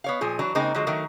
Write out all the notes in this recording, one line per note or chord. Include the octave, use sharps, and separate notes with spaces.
B3 C#5 F5
A#2 F3 G#4
E3 F#3 D4
C#3 G#3 A#3 C4 D#4
D3 F3 F#3 G#3
D#3 F#3 A3 A#4